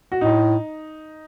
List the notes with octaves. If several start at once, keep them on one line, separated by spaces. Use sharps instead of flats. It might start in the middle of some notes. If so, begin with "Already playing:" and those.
F#4
A2 D#4